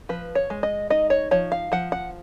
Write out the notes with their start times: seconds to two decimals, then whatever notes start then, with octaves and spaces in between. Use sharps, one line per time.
0.09 F3 B4
0.35 C#5
0.50 G#3
0.63 D#5
0.90 D#4 D#5
1.10 C#5
1.31 F3 C#5
1.52 F5
1.72 F3 F#5
1.92 F#5